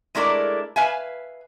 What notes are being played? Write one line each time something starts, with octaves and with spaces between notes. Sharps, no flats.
G#3 A3 D4 E4 A#4 D5
B4 E5 F5 G#5